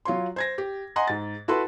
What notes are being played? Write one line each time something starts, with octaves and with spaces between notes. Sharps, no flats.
F#3 F4 C#5 C6
C5 G#6 A#6
G4
D#5 F#5 G#5 A#5 C6
G#2 A6
E4 F#4 A4 B4 C6